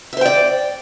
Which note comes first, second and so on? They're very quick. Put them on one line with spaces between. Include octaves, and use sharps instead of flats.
E5 C5 G5 D5